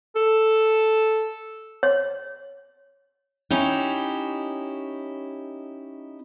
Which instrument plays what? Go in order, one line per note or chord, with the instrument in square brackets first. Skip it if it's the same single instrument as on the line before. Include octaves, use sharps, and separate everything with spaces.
[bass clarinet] A4
[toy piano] C#5
[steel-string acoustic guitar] C#4 D#4 E4 G4